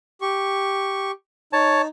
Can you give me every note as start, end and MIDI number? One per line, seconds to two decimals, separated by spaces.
0.21 1.11 67
0.21 1.11 85
1.53 1.88 63
1.53 1.82 73
1.53 1.82 81